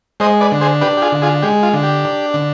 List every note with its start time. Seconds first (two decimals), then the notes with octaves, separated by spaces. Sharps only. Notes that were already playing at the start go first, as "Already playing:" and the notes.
0.20 G#3 C5 D#5
0.41 B4 D5
0.51 D3
0.61 G#4 C5
0.81 D4 G4 B4
0.97 G4
1.02 F4 G#4
1.12 D3
1.22 F4 G#4
1.42 G#3 G4
1.63 F4
1.73 D3
1.83 G4
2.04 D4
2.34 D3